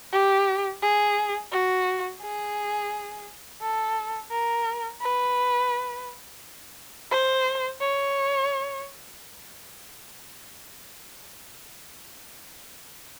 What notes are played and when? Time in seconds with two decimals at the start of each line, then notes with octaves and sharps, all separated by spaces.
0.12 G4
0.82 G#4
1.52 F#4
2.22 G#4
3.62 A4
4.31 A#4
5.02 B4
7.11 C5
7.80 C#5